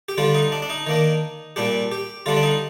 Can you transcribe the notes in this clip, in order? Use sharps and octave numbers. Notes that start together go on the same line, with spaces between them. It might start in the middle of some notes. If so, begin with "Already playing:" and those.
G4
D3 G3 D4 F4
D#4
D4
D4
D#4
D#3 A#3 D4
A#2 G3 D4 G4
G4
D3 G3 D4 F4
D4
D#4